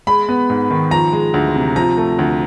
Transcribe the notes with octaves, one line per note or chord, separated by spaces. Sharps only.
G#3 B5
B3
G#2
D#3
F3 A#5
G#3
D2
C3
F3 A#5
A3
D2